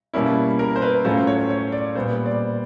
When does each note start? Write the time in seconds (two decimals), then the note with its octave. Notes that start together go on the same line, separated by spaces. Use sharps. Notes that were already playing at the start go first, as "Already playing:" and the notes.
0.13 B2 G3 A#3 C#4 E4
0.59 A#4
0.76 C5
0.82 B4
1.04 A2 F#3 A3 C#4 F4 C5
1.27 C#5
1.50 C#5
1.72 D5
1.95 A#2 G3 B3 C5
2.26 D5